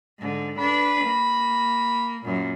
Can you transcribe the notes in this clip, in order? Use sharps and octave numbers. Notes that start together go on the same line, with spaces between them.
G#2 D3
D4 B4 B5
A#3
F#2 A#2